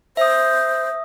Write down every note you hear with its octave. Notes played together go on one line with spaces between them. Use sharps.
C5 E5 D#6